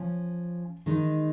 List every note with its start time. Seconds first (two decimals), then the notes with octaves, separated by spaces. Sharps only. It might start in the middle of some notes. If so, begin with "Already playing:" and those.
Already playing: F3 C#4
0.86 D#3 G#3 D#4